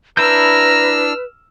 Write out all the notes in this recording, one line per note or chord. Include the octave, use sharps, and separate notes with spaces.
D4 E4 B4 A#5 E6 F6 G6